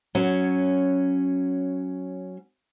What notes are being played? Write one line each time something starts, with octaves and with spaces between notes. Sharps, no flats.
F#3 C#4